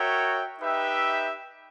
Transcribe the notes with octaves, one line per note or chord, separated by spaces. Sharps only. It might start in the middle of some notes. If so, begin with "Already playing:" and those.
Already playing: F#4 A#4 C#5 E5 G5
D#4 G4 B4 E5 G5